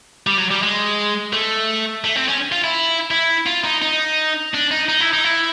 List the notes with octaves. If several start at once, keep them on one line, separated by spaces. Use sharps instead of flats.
G3
F#3
G3
G#3
A3
A3
C4
C#4
F4
E4
E4
F4
D#4
D#4
D4
D#4
D#4
E4
D#4
E4